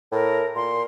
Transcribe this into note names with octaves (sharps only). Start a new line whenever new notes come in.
A2 A#4
A#2 C6